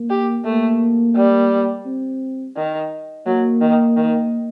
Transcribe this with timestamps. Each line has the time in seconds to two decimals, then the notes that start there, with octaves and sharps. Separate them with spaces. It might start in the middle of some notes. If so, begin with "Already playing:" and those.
Already playing: A#3
0.10 G4
0.45 A3 A#3
1.16 G3
1.86 C4
2.56 D#3
3.26 F#3 A#3
3.61 D#3
3.97 D#3